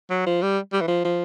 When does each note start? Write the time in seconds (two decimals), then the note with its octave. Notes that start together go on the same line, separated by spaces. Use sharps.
0.10 F#3
0.26 F3
0.42 G3
0.73 G3
0.81 E3
0.88 F3
1.05 F3